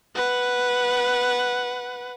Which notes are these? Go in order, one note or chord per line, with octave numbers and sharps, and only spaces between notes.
B4 F#5